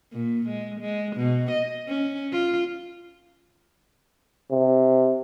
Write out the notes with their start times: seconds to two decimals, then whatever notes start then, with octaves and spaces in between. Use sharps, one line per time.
0.13 A#2
0.49 G#3
0.80 G#3
1.17 B2
1.51 D#5
1.88 C#4
2.32 F4
4.51 C3